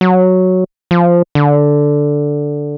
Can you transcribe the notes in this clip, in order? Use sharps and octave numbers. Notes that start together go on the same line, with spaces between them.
F#3
F3
D3